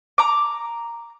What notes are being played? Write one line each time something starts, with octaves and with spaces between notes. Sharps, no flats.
A#5 D6